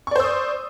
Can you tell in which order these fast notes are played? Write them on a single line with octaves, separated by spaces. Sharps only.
C#6 D5 C5 E6 D#6